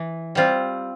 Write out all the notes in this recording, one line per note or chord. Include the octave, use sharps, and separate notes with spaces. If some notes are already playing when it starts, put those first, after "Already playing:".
Already playing: E3
G3 C4 F4